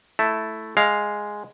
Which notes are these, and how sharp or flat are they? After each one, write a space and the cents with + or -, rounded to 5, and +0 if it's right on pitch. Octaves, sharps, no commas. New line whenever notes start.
A3 +0 E4 +0 A5 +0
G#3 +0 F5 +0